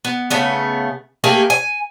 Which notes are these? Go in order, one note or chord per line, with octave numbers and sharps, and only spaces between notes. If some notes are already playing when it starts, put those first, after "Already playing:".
B3
C#3 A3 B3
A3 A#3 G4 G#4
G#5